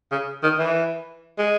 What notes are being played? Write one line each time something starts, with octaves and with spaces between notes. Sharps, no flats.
C#3
D#3
E3
G#3